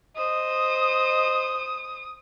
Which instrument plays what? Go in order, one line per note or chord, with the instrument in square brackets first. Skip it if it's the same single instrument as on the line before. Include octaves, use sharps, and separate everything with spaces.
[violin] C5 [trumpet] D#5 [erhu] D#6